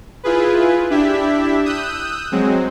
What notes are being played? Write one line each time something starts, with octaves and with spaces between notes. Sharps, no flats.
E4 F4 G#4 B4
D4 E4 G4 E5
D#6 E6 F#6 G6
F#3 G#3 C4